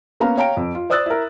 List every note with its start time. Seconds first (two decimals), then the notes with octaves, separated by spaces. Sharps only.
0.20 A#3 B3 C#4 F5 A#5
0.37 C#5 F5 G5 A#5 D7
0.57 F2
0.75 F4
0.90 C5 D5 D#6 E6 F#6 A6
1.06 E4 A#4